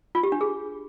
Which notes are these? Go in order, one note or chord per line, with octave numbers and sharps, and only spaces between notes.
F4
G4
D4
G#4